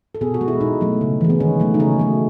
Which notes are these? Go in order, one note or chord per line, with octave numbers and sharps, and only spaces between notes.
A4
B2 G#4
F#4
G#3
E4
B2 D#4
F#3 A3
C#3
E3 G#3
B3
D#3 C#4
F#3 A3
D#4
C#3 C#4
F#3 A3